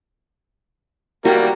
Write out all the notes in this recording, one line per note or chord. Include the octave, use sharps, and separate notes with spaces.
G3 A#3 F#4 G4